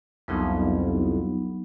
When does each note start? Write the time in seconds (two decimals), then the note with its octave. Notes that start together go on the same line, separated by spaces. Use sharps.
0.28 C2 F2 F#3 B3 D#4